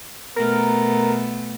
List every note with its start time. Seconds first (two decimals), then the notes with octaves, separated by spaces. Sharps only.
0.36 B2 A3 B3 A#4